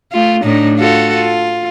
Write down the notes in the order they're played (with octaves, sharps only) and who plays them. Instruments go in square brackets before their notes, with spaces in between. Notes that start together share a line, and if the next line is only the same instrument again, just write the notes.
[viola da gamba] A3 F4
A2 D4 D#4
F4 F#4 A4
F4